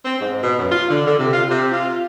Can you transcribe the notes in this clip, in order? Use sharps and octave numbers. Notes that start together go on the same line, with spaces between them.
C4
G#2
B2
F#2
F4
D3
D3
C3
F4
C3
F4